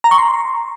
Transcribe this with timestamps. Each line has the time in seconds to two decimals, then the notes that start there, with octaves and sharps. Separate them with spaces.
0.04 A#5
0.11 C#6
0.18 C6